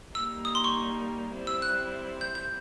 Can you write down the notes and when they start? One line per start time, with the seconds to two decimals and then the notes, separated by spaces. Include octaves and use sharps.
0.15 G3 A#3 D#4 E6
0.45 D#6
0.55 C6
0.64 C#6
1.33 G3 C4 E4
1.47 E6
1.62 F#6
2.21 G6
2.35 G6